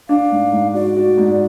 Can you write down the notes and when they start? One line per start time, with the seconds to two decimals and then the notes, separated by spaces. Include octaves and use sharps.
0.09 D4 F5
0.31 G#2
0.52 G#2
0.74 F#4 D5
0.96 F#4
1.18 G#2